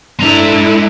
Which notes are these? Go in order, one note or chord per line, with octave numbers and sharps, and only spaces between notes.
G#3 D4 E4 A4 A#5